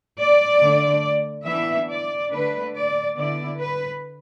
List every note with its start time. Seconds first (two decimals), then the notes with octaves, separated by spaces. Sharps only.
0.19 D5
0.61 D3 A3 D4
1.46 E3 B3 D4 E5
1.89 D5
2.31 D3 A3 D4 B4
2.74 D5
3.17 D3 B3 E4 D5
3.59 B4